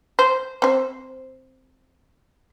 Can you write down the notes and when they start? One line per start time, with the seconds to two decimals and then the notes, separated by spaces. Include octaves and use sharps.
0.19 C5
0.62 C4 C5